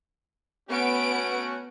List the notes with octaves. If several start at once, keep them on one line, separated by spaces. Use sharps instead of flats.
A3 B3 C#4 F#4 D7